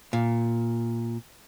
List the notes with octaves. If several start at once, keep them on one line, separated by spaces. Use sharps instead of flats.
A#2